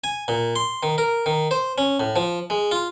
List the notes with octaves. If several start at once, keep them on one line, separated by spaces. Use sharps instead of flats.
G#5
A#2
C6
D#3
A#4
D#3
C5
C#4
A2
F3
G#3
F4